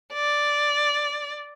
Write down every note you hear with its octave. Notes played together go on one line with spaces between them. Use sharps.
D5